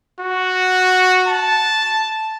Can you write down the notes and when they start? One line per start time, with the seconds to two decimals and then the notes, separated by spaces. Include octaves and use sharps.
0.20 F#4
1.28 A5